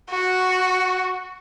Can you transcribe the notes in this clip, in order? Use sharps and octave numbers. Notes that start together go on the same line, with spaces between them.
F#4